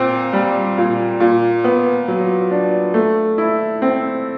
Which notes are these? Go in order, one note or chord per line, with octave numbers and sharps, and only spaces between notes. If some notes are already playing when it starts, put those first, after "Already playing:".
Already playing: A#2 C4
G3
A#2
A#2
B3
F#3
D4
A3
E4
C4